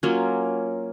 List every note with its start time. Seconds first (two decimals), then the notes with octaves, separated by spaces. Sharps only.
0.03 F#3 A#3 C#4 F4